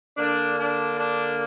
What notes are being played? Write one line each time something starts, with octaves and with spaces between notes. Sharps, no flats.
D3 A#3 D4
D4
D4